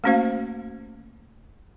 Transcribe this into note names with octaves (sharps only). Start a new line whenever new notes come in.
A3 A#3 C#4 F#4 C5 F5